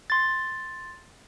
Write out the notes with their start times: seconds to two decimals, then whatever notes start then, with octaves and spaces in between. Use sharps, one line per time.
0.10 C6 A6